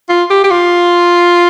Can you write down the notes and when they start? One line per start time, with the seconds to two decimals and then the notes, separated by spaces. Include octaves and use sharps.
0.09 F4
0.30 G4
0.44 G4
0.51 F4